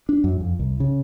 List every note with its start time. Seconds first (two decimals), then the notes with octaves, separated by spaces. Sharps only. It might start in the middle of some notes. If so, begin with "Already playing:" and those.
0.09 D4
0.24 F#2
0.41 F2
0.59 C2
0.80 C#3